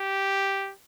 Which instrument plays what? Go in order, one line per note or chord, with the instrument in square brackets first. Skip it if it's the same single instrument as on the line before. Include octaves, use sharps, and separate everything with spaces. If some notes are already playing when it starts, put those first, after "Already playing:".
Already playing: [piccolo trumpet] G4